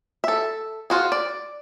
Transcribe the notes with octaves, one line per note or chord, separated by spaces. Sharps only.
A4 E5
F4 F#4 G#4
D5